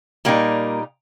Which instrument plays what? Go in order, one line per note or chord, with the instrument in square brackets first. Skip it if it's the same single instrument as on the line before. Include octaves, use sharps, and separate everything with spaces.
[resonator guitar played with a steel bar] A#2 G3 A#3 D#4